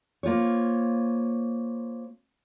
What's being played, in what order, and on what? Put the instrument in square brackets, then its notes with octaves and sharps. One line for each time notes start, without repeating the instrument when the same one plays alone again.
[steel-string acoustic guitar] A#3 F4 C5 C#5